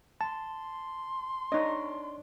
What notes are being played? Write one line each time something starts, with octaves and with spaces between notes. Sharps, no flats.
A5 C6
D4 D#4 C#5 D#5